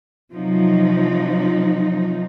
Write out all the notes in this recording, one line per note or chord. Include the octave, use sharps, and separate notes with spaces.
C3 F3 F#3 D#4